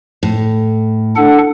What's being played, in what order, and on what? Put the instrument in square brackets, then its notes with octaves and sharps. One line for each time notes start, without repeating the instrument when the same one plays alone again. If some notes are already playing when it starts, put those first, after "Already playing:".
[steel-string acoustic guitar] A2
[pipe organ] D4 A4 F#5